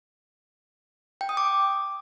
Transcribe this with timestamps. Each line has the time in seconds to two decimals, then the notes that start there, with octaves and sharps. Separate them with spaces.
1.21 G5
1.29 D#6
1.37 D6